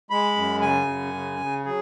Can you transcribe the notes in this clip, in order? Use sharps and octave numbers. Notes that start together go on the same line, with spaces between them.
G#3 B5
F#2
C#3 G#5
F#2
C#3
C#3
F#3 G#4